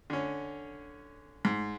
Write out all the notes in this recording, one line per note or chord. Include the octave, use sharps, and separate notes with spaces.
D3 C#4
G#2